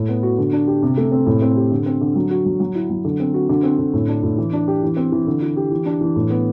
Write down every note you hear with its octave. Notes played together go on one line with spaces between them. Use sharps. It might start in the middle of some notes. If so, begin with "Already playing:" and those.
Already playing: A2
B3
F#4
D3
D4
G4
C3
A3
C4
A2
C4
G4
D3
C4
D3
F#3
F#4
F#3
F#3
E4
F#3
D3
C4
F#4
D3
C4
D3
A2
D4
A2
E3
D4
G4
E3
C4
E3
D3
E4
G4
E3
D4
E3
A2
B3